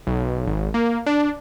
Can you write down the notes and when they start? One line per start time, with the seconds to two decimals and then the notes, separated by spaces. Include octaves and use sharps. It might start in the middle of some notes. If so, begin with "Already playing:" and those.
0.07 B1
0.47 G#1
0.74 A#3
1.06 D4